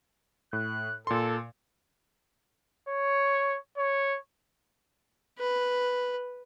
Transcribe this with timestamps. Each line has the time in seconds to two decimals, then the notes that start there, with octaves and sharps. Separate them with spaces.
0.53 A2 F#6
1.07 A#2 A4 C6
2.89 C#5
3.78 C#5
5.39 B4